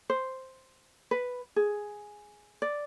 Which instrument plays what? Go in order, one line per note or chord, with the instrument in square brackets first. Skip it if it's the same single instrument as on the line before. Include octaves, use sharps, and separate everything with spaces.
[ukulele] C5
B4
G#4
D5